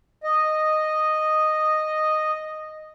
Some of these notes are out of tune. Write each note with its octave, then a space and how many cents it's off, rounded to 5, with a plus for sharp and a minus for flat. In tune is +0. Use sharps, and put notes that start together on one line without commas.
D#5 -5